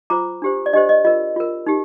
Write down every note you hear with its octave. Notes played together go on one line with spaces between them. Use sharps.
F4 C5 A#5 D6
D4 G4 C5
D5
D4 G4 C5 D#5
D#5
F4 A#4 D#5
F4 A#4
D#4 G4